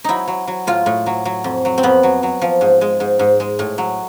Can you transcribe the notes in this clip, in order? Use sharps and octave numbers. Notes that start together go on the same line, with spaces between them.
F#3 D#4 E4
F#3
F#3
A2 F4
A2
F#3
F#3
F2
F#3
C4
F2 B3
F#3
F#3
F3
G#2
G#3
G#2
G#2
G#3
A2
F#3